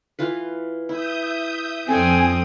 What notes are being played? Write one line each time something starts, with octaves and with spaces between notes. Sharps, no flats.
E3 F4 B4
E4 E5 D#6 G6
F2 C4 D4 A4 G#5 D#6